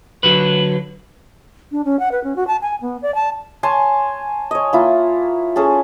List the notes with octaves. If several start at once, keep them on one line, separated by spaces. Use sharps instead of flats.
D3 F#3 B4
D4
C#4
F#5
B4
C#4
F#4
A5
G#5
B3
D5
A5
C#5 G#5 A5 C6
C#5 D#5
A#3 E4 F4
C#4 G#4 A4